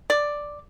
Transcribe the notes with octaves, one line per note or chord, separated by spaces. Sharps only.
D5